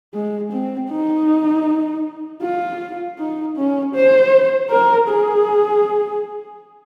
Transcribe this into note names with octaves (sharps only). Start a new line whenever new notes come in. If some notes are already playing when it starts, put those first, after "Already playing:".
G#3
C4
D#4
F4
D#4
C#4
C5
A#4
G#4